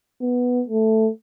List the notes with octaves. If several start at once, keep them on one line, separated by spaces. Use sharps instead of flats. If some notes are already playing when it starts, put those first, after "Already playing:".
B3
A3